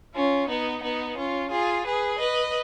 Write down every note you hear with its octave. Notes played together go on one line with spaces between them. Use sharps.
C#4 F4
B3 D#4
B3 D#4
C#4 F4
F4 G#4
G#4 B4
B4 D#5